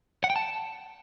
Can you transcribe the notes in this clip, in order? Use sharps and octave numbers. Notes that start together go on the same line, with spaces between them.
F#5
G5
A5